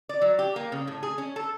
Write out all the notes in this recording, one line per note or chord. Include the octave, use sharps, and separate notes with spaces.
D5
F#3
G4
A#3
C#3
A2
G#4
C#4
A4